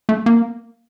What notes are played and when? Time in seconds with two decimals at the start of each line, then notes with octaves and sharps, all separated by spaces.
0.09 A3
0.26 A#3